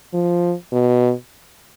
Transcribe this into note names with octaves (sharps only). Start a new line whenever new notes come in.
F3
B2